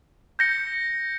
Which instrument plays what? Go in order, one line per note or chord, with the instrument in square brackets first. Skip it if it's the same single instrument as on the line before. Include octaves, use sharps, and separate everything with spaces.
[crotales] G6 A#6 C#7